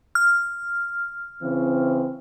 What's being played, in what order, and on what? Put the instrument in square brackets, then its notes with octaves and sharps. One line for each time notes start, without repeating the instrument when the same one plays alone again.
[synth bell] F6
[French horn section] C#3 E3 C4